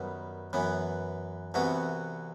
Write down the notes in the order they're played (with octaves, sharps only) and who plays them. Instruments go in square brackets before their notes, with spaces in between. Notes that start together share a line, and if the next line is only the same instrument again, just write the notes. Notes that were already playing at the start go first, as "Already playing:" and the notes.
Already playing: [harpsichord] F#2 D#3 G3 B3
F#2 E3 B3
C2 C3 E3 B3 F#4